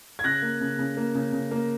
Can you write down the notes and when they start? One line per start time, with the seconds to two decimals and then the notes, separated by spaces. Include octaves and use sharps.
0.19 G#6
0.24 C#3 F#6 A#6
0.42 A#3
0.61 C#3
0.79 C#3
0.97 A#3
1.15 C#3
1.33 C#3
1.51 A#3